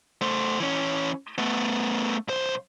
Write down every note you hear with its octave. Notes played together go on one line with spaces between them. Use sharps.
A3 C5
E3 C#4
A3 B3
B1 C5